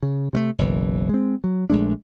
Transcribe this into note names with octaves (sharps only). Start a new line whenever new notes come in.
C#3
C3 G#3 A3
F#1 B1 E3
G#3 C4
F#3
A#1 G#3 A3 D4